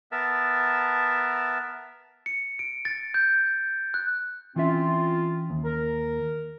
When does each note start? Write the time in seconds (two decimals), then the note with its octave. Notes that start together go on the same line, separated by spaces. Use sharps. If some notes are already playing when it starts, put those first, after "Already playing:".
0.12 B3 A#4 E5 A5
2.26 C#7
2.59 D7
2.85 A6
3.14 G6
3.94 F#6
4.56 E3 C4 C#4 F4 E5
5.50 D#2
5.65 A#4